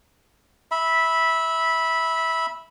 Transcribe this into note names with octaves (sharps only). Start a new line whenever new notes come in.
E5 B5